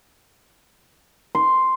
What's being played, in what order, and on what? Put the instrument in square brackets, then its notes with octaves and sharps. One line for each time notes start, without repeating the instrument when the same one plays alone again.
[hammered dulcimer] C6